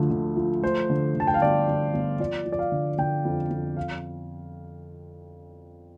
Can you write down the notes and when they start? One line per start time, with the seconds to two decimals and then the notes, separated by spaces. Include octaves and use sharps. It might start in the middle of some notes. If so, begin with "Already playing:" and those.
Already playing: D2 D3 F3 A3
0.10 D3
0.37 F3
0.62 A3 C5
0.90 D3
1.15 D3 A5
1.27 G5
1.34 F5
1.42 G1 D5
1.68 G1
1.94 G1
2.19 F3 D5
2.45 F3
2.52 D5
2.59 F5
2.72 D3
2.98 D3 G5
3.25 F2
3.50 F2
3.77 F5